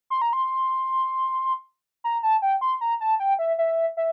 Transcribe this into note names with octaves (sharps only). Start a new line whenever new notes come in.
C6
A#5
C6
A#5
A5
G5
C6
A#5
A5
G5
E5
E5
E5